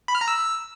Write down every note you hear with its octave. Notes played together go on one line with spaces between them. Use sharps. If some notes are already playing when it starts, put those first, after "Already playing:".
B5
F6
A#5
E6